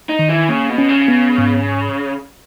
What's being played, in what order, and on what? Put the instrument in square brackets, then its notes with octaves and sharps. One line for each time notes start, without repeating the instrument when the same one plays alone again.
[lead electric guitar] D#4
[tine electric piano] D#3
[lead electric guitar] E3
[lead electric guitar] C#3 [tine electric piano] A#3
[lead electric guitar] B2
[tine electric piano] C#4
[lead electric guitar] C#3
[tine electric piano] B3
G#2